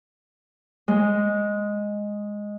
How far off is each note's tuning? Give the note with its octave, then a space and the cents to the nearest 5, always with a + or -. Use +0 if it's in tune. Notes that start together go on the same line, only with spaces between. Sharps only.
G#3 -5